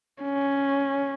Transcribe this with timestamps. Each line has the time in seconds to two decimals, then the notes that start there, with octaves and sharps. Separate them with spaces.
0.23 C#4